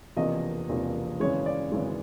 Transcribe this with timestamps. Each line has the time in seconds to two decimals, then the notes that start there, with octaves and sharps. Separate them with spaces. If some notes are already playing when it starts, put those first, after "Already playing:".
0.16 E1 E2 C3 F3 A#3 D#5
0.69 E1 E2 C3 F3 A#3
1.20 G#1 F#2 C#3 E3 G#3 C#5
1.46 D5
1.72 G#1 F#2 C#3 E3 G#3